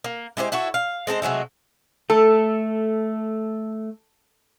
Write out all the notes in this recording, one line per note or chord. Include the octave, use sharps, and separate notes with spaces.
A#3
G#3 E4 G4 C5
E4 F#4 A4 C#5
F5
G#3 C4 A4 C5
C3 F#3 G#3 A3
A3 A4